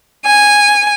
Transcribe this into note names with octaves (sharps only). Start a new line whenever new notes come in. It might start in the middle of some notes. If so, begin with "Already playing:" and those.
G#5